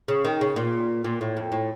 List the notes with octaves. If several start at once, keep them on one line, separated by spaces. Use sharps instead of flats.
C#3
D#3
C#3
A#2
A#2
A2
F2
A2